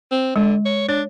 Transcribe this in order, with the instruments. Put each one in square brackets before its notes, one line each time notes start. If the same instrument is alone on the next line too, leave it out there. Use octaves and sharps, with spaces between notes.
[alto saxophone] C4
[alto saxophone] D3 [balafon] G#3
[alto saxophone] C#5
[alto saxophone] D4 [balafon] C#5